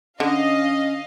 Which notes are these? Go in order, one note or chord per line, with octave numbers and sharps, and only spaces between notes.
D3 C#4 D#5 F5